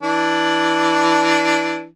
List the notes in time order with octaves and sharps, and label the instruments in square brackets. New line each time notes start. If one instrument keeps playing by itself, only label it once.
[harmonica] E3 D4